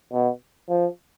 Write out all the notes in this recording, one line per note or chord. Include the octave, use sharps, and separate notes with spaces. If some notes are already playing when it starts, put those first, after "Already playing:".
B2
F3